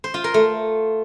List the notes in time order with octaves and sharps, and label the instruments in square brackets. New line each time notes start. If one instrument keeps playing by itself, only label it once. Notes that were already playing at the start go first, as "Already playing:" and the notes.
[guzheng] C5
F4
A#4
A3